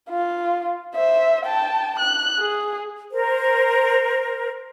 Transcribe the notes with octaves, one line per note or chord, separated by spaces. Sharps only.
F4
C5 E5
G5 A5
F#6
G#4
A#4 C5